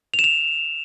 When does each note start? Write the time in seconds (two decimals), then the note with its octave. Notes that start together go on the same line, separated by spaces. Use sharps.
0.14 F7
0.19 E7
0.24 F7